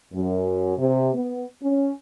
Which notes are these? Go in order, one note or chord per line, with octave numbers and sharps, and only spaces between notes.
F#2
C3
B3
C#4